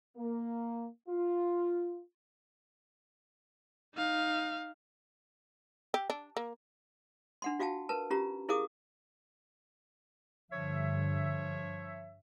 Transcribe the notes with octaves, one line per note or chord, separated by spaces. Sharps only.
A#3
F4
D#4 F5
G4
D4
A#3
D4 F#5 C6
F4 F#4 F5 G5 A5
A#4 B4 A5
C#4 F4 G4 A#5
E4 G#4 A#4 F5 D6 D#6
G2 D3 F3 C#5 E5